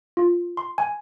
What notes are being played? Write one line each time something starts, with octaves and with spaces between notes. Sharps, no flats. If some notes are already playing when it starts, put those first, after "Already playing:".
F4
C6
G#5